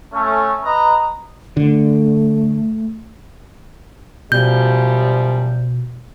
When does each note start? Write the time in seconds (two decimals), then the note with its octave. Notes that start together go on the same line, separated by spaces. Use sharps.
0.14 A3 C#4
0.65 B4 D#5 A#5
1.57 D3 A3
4.32 F#2 B2 F3 G3 G6